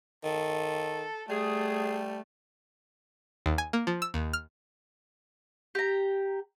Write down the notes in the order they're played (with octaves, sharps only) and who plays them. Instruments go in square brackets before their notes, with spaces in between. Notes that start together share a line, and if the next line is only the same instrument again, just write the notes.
[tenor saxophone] D#3 [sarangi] A4
[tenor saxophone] G3 [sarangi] A3 [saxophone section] G#4
[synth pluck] D#2
G#5
A#3
F3
E6
D#2
F6
[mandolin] G4 A#5